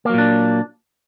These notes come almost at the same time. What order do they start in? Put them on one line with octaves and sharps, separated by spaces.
A#3 F#3 A#2 D4